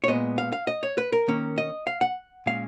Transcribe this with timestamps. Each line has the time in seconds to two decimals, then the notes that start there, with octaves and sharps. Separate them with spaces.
0.04 C#5
0.08 A#2 G#3 B3 D#5
0.38 F5
0.52 F5
0.67 D#5
0.83 C#5
0.98 B4
1.12 A#4
1.28 D#3 A#3 C#4
1.58 D#5
1.87 F5
2.01 F#5
2.46 A#2 G#3 C#4 F5